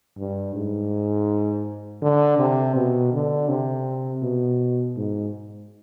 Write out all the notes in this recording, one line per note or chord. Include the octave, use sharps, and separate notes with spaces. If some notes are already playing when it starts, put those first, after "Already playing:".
G2
G#2
D3
C3
B2
D3
C3
B2
G#2